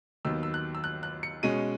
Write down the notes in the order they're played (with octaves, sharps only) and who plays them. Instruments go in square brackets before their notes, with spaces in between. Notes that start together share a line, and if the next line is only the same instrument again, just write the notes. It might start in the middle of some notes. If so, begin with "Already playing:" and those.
[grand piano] D#2 D#3 F#3 B3 E6
E6
F#6
E6
F#6
F#6
C#7
B2 G#3 C#4 D#7